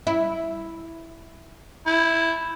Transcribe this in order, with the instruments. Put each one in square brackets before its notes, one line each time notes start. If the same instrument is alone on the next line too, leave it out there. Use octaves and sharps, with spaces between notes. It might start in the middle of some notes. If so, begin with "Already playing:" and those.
[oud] E4
[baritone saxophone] E4